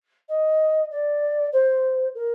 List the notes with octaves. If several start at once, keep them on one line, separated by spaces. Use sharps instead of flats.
D#5
D5
C5
A#4